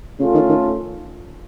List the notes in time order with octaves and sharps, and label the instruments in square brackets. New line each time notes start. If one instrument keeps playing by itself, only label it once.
[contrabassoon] C#3 [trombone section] A3 C#4 F4 A4
[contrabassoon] D#3
D#3